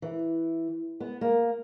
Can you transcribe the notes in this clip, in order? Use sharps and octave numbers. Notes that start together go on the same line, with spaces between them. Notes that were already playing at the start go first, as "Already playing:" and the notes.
E3
B3
A#3